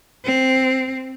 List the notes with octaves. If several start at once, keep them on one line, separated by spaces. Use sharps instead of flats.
C4